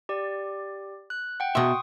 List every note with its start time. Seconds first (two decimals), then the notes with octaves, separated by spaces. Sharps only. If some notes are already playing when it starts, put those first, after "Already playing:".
0.09 G4 D5
1.10 F#6
1.40 F#5 G5
1.55 B2 E5 C6 C#6 D#6